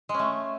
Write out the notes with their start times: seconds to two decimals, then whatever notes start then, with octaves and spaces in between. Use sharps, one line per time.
0.09 G#3
0.14 C#4
0.19 A3